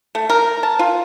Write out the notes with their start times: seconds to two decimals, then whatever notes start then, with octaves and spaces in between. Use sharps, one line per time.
0.15 A3
0.30 A#4
0.63 A5
0.79 F4